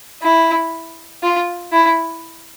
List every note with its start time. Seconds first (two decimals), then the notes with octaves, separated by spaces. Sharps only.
0.22 E4
1.23 F4
1.72 E4